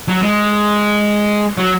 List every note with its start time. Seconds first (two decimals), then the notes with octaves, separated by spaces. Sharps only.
0.08 F#3
0.22 G#3
1.58 F#3